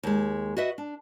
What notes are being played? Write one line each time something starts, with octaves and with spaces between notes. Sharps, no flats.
D#2 G#3
F#4 B4 D#5 E5
D4